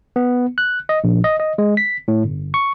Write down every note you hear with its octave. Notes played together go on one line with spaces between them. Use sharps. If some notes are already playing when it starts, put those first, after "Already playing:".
B3
F#6
D#5
A#1
D#5
D#5
G#3
B6
A2
G1
C#6